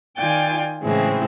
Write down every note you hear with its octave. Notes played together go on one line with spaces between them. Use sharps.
D#3 F4 D5 G5 G#5 A6
A2 C#3 E3 G#3 C4 E4